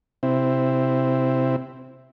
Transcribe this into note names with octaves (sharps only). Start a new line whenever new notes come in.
C3 C4 E4